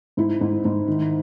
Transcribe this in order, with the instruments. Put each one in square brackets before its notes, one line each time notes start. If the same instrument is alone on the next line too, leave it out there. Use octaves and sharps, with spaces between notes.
[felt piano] G#2 E4
G#2
G#2
D#3